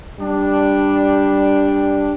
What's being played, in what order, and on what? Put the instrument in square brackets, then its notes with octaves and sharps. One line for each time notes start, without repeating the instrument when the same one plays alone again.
[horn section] G3 D4